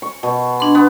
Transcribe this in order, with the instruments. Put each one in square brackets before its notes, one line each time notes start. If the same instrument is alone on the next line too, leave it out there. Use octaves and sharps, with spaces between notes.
[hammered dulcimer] C#6
B2
[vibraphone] D4 C6
[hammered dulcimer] B3